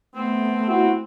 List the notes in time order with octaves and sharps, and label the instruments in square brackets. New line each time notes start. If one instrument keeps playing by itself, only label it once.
[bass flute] A3 [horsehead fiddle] B3 [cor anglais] C4
[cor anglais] C4 [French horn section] E4 F#4